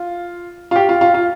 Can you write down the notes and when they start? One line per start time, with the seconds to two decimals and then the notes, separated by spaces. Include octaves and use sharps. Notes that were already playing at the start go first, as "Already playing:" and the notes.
Already playing: F4
0.71 F4
0.76 G4
0.89 F4
1.01 F4
1.14 F4